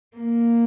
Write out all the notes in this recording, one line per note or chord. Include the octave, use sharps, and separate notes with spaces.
A#3